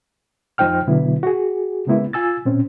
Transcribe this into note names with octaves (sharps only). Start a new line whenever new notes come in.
F2 F3 D#4 C5 G5 F6
B2 D3 F#3 B3 E4
F#4 G#4
C#3 G#3 A#3 B3 E4
F4 G#5 E6 A6
A#2 C4 C#4